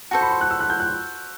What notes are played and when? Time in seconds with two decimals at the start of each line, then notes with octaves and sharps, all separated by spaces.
0.11 F#4 A4 C5 A5
0.21 B5
0.31 C6
0.41 F#6
0.50 E6
0.60 F#6
0.70 G6
0.80 F#6